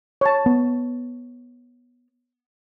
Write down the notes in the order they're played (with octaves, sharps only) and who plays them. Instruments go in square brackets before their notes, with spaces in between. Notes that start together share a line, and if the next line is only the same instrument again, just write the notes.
[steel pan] C#5 A5
[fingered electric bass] B3